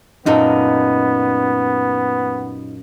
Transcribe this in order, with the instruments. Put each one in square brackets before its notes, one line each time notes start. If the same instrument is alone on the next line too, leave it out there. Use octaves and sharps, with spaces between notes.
[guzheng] F#2 A#2 [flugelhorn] B3 [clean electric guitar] D#4 A4